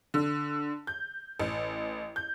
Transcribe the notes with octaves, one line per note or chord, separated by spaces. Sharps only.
D3
G6
A1
G6